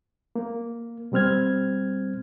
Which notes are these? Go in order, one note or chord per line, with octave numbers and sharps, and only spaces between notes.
A#3
B2 G3 C4 F6 G#6